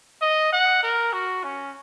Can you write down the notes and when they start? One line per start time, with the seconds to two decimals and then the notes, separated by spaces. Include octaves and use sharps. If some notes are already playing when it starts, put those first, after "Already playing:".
0.22 D#5
0.53 F#5
0.83 A#4
1.13 F#4
1.44 C#4